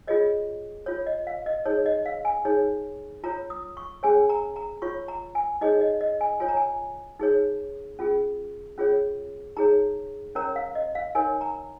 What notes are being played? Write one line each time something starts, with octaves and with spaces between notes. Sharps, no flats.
F4 G#4 C#5 D#5
F4 C#5
D#5
F5
D#5
D#4 G#4 C#5
D#5
F5
G#5
D#4 G#4 C#5
F4 C#5 A#5
D#6
C#6
C#4 G#4 C#5 G#5
A#5
A#5
F4 C#5 C#6
A#5
G#5
D#4 G#4 C#5 D#5
D#5
D#5
G#5
F4 C#5 G#5
A#5
G#5
D#4 G#4 C#5
C#4 F4 G#4
C#4 F4 G#4 C#5
D#4 G#4 C#5 A#5
C#4 A#4 C#5 A#5
F5
D#5
F5
D#4 A#4 C#5 G#5
A#5